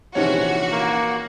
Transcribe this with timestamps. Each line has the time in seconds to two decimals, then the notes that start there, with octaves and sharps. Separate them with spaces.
0.15 A#1 C3 D#3 E3 C#4 F#4 C#5
0.72 A#3